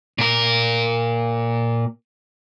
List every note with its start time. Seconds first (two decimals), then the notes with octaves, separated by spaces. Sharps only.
0.18 A#2 A#4